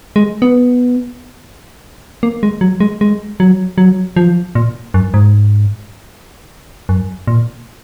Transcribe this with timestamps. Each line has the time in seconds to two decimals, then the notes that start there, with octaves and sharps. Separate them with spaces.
0.16 G#3
0.42 B3
2.23 A#3
2.43 G#3
2.61 F#3
2.80 G#3
3.01 G#3
3.40 F#3
3.78 F#3
4.16 F3
4.55 A#2
4.94 F#2
5.14 G#2
6.89 F#2
7.27 A#2